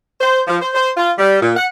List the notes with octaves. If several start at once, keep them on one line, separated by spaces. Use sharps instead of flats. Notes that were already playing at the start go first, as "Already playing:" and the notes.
C5
F3
C5
C5
F4
G3
A#2
F#5